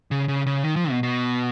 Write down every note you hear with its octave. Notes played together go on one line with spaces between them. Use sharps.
C#3
C#3
C#3
D#3
F3
B2
B2